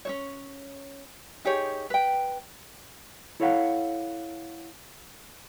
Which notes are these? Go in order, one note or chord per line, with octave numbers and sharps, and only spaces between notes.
C#4 D#4 C#5
D#4 G4 G#4 C#5
B4 G5
E4 A4 C#5 D5 F5 F#5